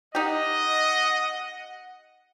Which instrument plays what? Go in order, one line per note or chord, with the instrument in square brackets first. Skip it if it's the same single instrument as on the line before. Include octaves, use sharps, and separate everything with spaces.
[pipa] D#4 G4 [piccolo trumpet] D#5 [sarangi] F#5